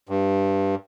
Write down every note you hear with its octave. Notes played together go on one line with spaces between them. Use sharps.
G2